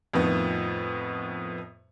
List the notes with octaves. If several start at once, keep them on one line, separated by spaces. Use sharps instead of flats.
F2 A2 D#3 F3 B3